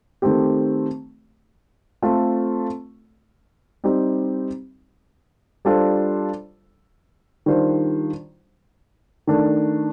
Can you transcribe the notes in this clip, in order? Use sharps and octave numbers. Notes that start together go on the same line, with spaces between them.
D#3 A3 C4 G4
A3 C4 F4 A4
G3 C4 D#4 G4
G3 D4 F4 A4 C5
D#3 G3 D4 F4 C5
D#3 A3 D4